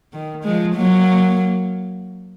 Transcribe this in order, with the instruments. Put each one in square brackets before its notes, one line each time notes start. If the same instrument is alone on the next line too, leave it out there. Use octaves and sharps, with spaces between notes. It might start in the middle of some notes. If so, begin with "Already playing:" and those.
[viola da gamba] D#3
F3 G#3
F#3 A#3